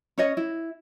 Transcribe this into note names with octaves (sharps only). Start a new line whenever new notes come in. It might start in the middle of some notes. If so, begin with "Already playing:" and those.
C#4 C#5 D#5
E4